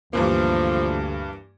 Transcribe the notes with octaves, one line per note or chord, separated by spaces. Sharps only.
D2 G2 E3 F3 A#3